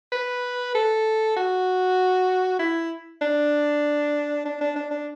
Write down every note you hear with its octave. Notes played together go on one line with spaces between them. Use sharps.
B4
A4
F#4
E4
D4
D4
D4
D4
D4